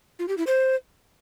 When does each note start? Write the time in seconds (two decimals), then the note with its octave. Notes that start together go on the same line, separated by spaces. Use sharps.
0.19 F4
0.28 G4
0.37 E4
0.47 C5